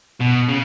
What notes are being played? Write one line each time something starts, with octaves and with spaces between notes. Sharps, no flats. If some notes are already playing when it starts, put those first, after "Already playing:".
B2
C#3